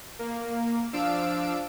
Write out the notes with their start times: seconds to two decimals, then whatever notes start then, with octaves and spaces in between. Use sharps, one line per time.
0.19 A#3
0.93 F3 D4 F5 E6 D7